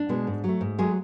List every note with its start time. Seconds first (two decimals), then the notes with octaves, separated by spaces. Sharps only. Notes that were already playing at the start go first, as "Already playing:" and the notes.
Already playing: D4
0.09 B2 G#3 B3
0.27 G#2
0.44 F#3 A3
0.61 G#2
0.79 F#3 G#3 A3 G#4